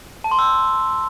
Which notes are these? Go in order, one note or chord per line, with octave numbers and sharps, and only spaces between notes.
A5
C6
E6